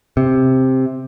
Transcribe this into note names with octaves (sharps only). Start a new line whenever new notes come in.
C3